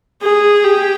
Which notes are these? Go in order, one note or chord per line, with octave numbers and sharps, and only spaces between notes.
G#4
G4